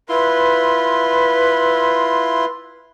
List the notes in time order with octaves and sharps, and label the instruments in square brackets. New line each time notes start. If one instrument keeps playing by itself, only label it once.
[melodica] E4 F4 C6 [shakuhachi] B4